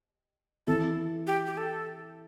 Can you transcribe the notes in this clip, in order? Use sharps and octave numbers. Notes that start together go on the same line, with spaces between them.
E3 C4 E4 A4
G4
G4
A4